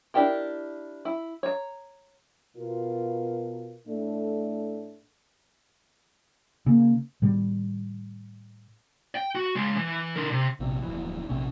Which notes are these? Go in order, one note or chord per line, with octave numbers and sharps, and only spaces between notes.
D4 E4 G4 A#4
E4
C#5 A#5
B2 F4 A#4
A2 A3 D4 A4
C#3 A#3
A2 D#3 G3
G5
F#4
C#3 G#3
E3
D3 A#4
C3
A#1 C3
D1 F2 E3
A#1 C3 C#4